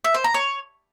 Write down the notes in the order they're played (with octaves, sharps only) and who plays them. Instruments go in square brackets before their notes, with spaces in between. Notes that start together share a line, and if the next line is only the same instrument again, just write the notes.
[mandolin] E5
C5
A#5
C#5